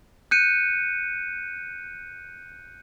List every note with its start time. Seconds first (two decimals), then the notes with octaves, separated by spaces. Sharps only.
0.31 F#6 G6 C#7 D#7